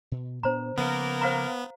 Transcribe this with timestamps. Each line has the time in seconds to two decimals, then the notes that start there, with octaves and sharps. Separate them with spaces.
0.12 B2
0.43 A#2 B3 D4 C5 A#5
0.77 C#3 F3 A#3 B3 A#4
1.22 C5 F5 A#5